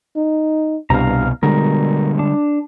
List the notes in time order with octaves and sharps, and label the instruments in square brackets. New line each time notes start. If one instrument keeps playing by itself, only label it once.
[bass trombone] D#4
[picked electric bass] C2 B2 [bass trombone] G2 [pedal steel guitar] F5 A#5
[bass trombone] B2 [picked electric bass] D3 G3 G#3 [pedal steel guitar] A#4
[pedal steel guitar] D4